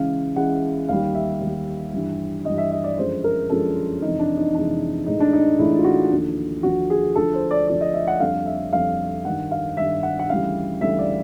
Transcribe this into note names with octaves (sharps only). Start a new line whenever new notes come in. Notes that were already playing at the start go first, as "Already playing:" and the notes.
Already playing: C#2 C#3 E3 G#3 F5
C#2 C#3 E3 G#3 F#5
D#2 D#3 G3 F5
E5
D#2 D#3 G3
G2 E3 G3
G2 E3 G3 D#5
E5
D#5
D5
F#2 D3 F3 G#3 C5
A#4
F#2 D3 F3 G#3 A4
F2 C3 E3 G#3 D#4
D4
D#4
F2 C3 E3 G#3 D4
A2 E3 G#3 D#4
D4
D#4
A2 E3 G#3 E4
F4
F#4
D#2 D3 F3
D#2 D3 F3 F#4
G#4
D2 D3 F3 A3 A4
C5
D5
D2 D3 F3 A3 D5
D#5
E5
F#5
F2 D3 G3 F5
E5
F2 D3 G3 F5
G2 D#3 G3 F#5
F5
G2 D#3 G3 E5
F#5
F#5
D2 C#3 E3 G3 F5
D2 C#3 E3 G3 E5
D5